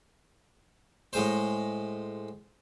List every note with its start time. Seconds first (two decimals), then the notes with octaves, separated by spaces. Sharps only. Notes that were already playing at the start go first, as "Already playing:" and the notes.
1.13 A2 G#3 C5